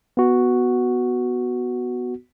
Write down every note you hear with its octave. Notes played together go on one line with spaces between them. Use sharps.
B3 F#4